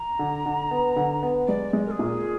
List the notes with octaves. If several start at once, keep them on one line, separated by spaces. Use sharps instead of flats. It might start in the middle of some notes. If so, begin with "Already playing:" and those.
Already playing: A#5
D3
D3
B3
D3
B3
G#3 D5
G#3
A#4
G#4
A#2